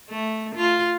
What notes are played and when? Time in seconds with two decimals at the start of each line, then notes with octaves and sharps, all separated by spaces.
0.10 A3
0.55 F4